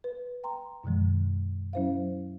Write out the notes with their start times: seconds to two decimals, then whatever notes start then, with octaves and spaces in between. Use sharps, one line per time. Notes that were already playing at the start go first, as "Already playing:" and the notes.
0.04 B4
0.44 G5 A#5 C6
0.84 F#2 B2 D#3 F3 G#3
1.73 F#3 C#4 E4 C5 E5 F5